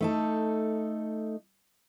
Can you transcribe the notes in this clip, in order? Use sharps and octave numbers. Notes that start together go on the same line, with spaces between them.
A3 D#4 A4